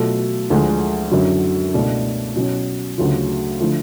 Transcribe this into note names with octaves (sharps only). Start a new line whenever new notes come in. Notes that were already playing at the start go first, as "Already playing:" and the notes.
Already playing: B2 F#3 A3 F4 A4
D2 D3 F3 G#3
F#2 D3 F#3
C#2 B2 A3 D4
B2 F#3 C#4
D2 C#3 F#3 A3 F4
D3 F3 A3 F4